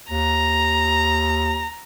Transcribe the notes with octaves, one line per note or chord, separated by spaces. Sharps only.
D#2 A#5